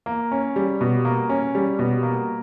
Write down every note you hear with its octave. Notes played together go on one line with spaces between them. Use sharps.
A#3
C#4
G3
B2
A#3
C#4
G3
B2
A#3